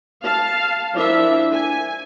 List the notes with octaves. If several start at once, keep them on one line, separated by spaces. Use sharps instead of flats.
F5 A5
F3 D4 E4 A#4 E5
G#5